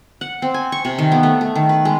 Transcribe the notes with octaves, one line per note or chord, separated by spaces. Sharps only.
F#5
C4
G#5
C#6
C3
D#3
B3
A3
A3
D#3
B4
G#3